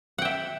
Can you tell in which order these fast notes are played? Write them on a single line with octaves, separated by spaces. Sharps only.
F#5 G5 E5